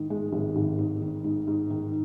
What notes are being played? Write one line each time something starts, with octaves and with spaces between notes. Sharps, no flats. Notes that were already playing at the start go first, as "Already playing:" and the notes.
Already playing: G#2 D#3
G#3
G#1
G#1
G#2
D#3
G#2
G#2
D#3